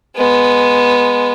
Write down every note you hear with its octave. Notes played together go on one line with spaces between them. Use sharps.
G#3 B3